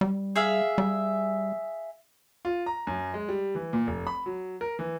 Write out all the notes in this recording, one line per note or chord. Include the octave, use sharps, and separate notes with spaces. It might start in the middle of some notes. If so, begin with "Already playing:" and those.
G3
G#4 E5 F5
G3
F4
A#5
F#2
G#3
G3
E3
A#2
F1
B5
F#3
A#4
E3